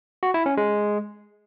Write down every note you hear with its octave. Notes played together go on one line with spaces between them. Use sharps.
F#4
E4
C#4
G#3